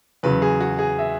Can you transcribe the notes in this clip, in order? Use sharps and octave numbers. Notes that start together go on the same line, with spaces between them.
E2 C#3 F#3 B4
G#4
F#4
G#4
E5